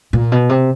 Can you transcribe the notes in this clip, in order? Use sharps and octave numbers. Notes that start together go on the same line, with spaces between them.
A#2
B2
C3